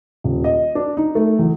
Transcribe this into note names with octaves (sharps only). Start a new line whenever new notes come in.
D#1
D#5
D4
D#4
A3
E2